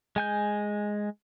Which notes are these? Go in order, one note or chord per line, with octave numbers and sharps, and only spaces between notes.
G#3 G#5 G6